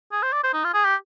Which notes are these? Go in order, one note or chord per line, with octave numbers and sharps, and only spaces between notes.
G#4
C5
D5
C5
D#4
F4
G#4
G4